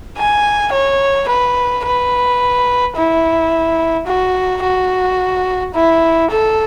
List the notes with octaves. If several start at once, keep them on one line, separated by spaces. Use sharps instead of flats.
G#5
C#5
B4
B4
E4
F#4
F#4
E4
A4